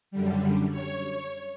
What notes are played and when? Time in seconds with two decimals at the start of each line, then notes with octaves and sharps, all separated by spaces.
0.11 F#2 D3 G3
0.71 C#5